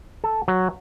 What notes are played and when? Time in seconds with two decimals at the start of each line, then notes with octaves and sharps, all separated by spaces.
0.24 A4
0.48 F#3